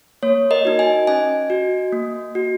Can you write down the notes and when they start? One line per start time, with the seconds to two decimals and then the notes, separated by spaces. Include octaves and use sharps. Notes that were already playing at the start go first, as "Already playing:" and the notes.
0.23 A#3 C#5
0.51 A#4 D#5
0.65 D#4 F#4
0.79 D#5 G#5
1.07 C#4 D#5 G#5
1.50 F#4
1.93 A#3
2.35 F#4